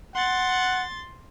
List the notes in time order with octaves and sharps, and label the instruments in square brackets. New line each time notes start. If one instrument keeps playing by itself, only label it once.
[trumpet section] F#5 [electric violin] C6 A6